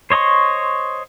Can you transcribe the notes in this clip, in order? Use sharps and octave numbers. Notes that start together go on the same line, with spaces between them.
C5 C#5 D#5 C6 C#6